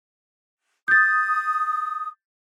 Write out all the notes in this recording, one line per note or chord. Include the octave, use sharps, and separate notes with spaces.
D#6 G6 A6